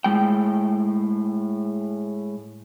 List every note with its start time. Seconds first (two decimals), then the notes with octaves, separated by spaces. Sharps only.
0.04 A2 G#3 G5